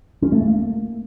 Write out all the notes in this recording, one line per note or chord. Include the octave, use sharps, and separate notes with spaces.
C#4
A3
A#3